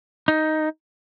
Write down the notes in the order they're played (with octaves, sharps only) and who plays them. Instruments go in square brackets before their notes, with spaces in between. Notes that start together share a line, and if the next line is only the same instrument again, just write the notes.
[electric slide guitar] D#4